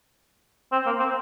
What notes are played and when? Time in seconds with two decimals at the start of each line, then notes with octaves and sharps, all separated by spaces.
0.72 C4
0.86 A#3
1.00 C4